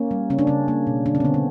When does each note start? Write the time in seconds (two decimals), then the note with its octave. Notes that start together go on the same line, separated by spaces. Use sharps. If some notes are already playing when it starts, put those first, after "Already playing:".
Already playing: A#3 C#4
0.11 G3
0.30 C#3 C#4
0.39 D4
0.47 C#3 C#4
0.68 A#3
0.87 B2
1.06 D3 D4
1.15 C#4
1.20 B3
1.25 D3 C4
1.34 B3